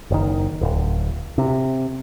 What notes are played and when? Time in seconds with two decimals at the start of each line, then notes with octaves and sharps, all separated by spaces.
0.11 F#1 D#3
0.61 D1
1.38 C3